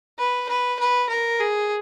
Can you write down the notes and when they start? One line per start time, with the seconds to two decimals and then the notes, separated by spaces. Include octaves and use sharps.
0.18 B4
0.49 B4
0.79 B4
1.10 A#4
1.40 G#4